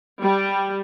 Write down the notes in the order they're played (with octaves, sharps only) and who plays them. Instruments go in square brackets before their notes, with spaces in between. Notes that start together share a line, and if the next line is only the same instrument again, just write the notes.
[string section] G3